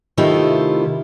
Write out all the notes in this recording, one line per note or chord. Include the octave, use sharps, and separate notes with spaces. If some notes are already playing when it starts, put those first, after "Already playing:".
C3 D#3 A3 E4 F4 G4